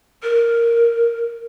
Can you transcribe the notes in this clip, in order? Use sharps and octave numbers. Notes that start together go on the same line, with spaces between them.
A#4